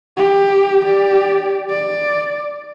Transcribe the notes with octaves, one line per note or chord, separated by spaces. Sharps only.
G4
G4 D5
D5